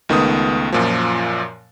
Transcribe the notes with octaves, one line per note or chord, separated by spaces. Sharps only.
C#2 D#3 A3 B3 D#6
F#2 A#2 F3